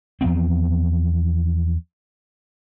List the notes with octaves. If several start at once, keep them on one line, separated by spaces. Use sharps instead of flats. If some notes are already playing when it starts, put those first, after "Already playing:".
E2 F3 B3 C4